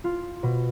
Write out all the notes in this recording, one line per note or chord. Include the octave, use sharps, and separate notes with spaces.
F4
B2